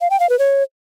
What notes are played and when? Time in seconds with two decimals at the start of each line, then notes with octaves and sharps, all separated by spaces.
0.01 F5
0.10 G5
0.20 F5
0.30 B4
0.39 C#5